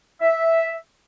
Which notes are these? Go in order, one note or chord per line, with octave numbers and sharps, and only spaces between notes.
E5